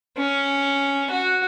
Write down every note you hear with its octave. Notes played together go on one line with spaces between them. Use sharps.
C#4
F#4